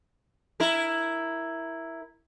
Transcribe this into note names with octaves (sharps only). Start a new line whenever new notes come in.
E4 A#4